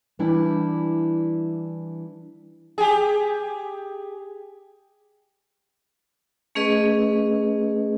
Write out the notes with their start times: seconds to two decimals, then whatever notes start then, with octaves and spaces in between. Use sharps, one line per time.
0.19 E3 G3 D4 E4 G#5
2.78 G4 G#4
6.55 A3 C#4 G#4 B4 D#5